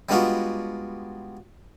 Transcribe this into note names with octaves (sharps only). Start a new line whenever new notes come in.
G3 G#3 B3 D4 F4 F#4